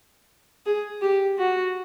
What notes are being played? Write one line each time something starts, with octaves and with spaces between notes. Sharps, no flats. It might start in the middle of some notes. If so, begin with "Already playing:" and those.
G#4
G4
F#4